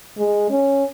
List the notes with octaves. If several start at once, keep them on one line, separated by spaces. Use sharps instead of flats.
G#3
C#4